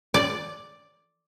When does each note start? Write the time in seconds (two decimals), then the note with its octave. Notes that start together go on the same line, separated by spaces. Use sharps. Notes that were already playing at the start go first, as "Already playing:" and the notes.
0.14 D5